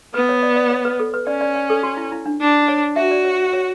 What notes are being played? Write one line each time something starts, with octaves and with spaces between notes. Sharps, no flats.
B3 B4
C#5
D5
D5
C#5
B4
A4
B4
C#4 D5
D5
D5
A4
F#4
E4
E4
D4
D4
C#5
F#4 E5
D5
C#5
C#5